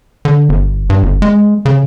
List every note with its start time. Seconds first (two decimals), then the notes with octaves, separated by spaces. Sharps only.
0.25 D3
0.49 G1
0.90 G2
1.03 G1
1.22 G#3
1.65 C#3